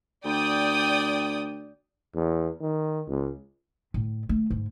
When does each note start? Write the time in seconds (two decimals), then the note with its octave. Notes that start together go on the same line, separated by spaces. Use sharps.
0.25 D2 D5 G5 D#6
2.15 E2
2.61 D#3
3.08 C#2
3.94 A2
4.29 A3
4.51 G#2